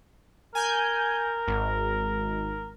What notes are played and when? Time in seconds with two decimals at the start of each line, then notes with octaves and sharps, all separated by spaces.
0.55 A#4 G#5 G6
1.47 G#1